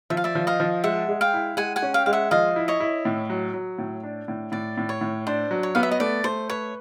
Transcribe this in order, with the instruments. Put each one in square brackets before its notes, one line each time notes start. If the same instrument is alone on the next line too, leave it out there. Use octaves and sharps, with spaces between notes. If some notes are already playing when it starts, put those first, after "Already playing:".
[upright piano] F3 [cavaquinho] E5
[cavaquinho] F5
D5 E5
[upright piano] F3
[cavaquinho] D#5 F5
[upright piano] F3
[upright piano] G#3 [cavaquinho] E5 F#5
[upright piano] G#3
[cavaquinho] F5 G5
[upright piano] E4
[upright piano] G#3 [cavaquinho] F#5 G#5
[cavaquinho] F#5 G#5
[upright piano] C#4
[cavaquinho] F5 G5
[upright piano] G#3 [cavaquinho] F5
[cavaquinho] E5 F#5
[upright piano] F3 [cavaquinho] D#5 F5
[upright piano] E4
[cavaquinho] C#5 D#5
[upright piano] E4
A2
F#3
F#3
A2
D4
A2
[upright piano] A2 [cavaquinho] D5
[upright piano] A2
[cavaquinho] C#5
[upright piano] A2
[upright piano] D4 [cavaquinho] C5
[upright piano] F#3
[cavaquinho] C#5
[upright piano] B3 [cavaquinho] F5
[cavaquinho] E5
D#5
[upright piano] A3 [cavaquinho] D5
[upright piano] A3 [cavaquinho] C5
[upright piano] B4 [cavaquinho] C#5